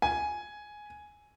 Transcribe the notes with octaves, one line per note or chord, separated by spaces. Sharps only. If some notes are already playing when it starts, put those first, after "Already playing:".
G#5